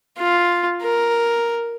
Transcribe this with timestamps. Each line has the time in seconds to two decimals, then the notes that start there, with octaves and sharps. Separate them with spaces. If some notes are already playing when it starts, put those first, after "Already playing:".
0.19 F4
0.82 A#4